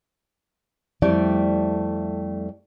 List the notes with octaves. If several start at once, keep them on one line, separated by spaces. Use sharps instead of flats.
F2 G3 A3 E4 D5